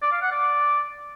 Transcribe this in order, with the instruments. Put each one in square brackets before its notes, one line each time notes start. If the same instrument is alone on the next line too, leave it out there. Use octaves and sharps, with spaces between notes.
[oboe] D5
F5
F#5
D5